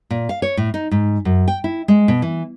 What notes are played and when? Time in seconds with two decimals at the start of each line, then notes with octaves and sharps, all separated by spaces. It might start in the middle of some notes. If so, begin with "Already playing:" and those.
0.10 A#2
0.29 F5
0.42 C#5
0.57 A2
0.74 D#4
0.91 G#2
1.25 F#2
1.48 G5
1.64 E4
1.88 G#3
2.08 B2
2.22 E3